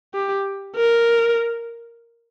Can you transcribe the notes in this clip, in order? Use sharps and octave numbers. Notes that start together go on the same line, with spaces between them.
G4
A#4